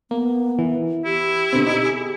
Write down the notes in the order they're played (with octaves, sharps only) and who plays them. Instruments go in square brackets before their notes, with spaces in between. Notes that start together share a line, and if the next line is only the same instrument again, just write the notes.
[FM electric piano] A#3 [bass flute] B3
[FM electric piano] E3
[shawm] E4 [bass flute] G4
[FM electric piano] B2 D3 C4
D#4
G#4